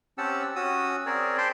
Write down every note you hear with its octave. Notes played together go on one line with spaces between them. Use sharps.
C4 C#4 G4 F#5 A5 E6
C#4 F#4 D#6 E6
C4 G#4 A#4 C#5 D5
C5 G5 A5 B5 C6